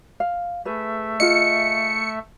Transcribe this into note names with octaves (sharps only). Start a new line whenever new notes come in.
F5
A3 G#4 B4 E5
F4 G#4 D#5 C#7